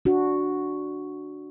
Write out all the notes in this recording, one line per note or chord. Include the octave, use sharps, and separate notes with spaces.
D4 F#4